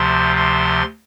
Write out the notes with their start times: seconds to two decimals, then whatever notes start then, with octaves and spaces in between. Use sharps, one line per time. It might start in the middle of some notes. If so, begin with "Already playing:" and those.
Already playing: D2 C3 F3 C6
0.36 C6